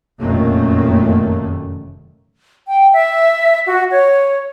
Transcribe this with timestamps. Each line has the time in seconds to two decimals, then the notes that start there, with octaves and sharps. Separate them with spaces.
0.21 F1 F#2 A#2 D#3 A3 A#3
2.67 G5
2.92 E5
3.66 F#4
3.91 C#5